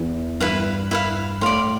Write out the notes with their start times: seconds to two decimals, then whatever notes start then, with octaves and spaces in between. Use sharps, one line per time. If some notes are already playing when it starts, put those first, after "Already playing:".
Already playing: E2 E3
0.40 G2 E4 B4 F5
0.91 E4 B4 F5
1.41 A2 D5 F5 C6